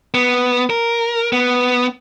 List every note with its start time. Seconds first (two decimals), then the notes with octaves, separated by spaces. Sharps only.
0.14 B3
0.70 A#4
1.33 B3